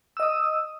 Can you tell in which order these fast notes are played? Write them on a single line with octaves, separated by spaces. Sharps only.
E6 D#5 D#6